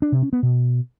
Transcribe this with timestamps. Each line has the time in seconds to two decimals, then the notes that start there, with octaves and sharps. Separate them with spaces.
0.02 D4
0.12 C3
0.22 C#4
0.33 B3
0.43 B2